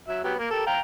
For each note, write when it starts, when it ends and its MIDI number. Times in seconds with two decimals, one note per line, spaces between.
0.08 0.21 54
0.08 0.21 76
0.24 0.35 54
0.24 0.35 59
0.24 0.35 67
0.39 0.50 58
0.51 0.64 67
0.51 0.64 69
0.51 0.64 70
0.66 0.80 77
0.66 0.80 79
0.66 0.80 82